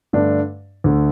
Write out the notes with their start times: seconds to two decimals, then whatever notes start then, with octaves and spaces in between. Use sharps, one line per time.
0.13 G2 D3 A3 D4
0.84 D2 D3 A3